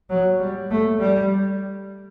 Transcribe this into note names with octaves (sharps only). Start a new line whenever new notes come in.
F#3
G3
A3
G3